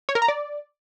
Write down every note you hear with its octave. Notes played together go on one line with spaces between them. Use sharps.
C#5
A#4
A#5
D5